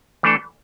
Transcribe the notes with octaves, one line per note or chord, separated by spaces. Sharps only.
E3 A3 D4 A4